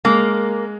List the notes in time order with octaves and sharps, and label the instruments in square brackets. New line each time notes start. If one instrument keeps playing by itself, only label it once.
[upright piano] G#3 [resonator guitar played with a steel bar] A#3